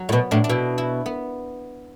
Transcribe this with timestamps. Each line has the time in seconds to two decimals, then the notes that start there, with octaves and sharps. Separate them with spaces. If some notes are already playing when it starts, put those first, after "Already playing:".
Already playing: F#3
0.09 A2
0.12 B2 B3
0.31 A2 D4
0.44 D4
0.49 B2 E4
0.78 E4
1.06 B3